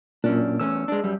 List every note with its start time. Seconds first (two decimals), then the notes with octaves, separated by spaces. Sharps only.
0.24 F#2 A#2 C#4 D4
0.60 E2 A3 C#4 E6
0.88 G#3 D4
1.04 F#2 G3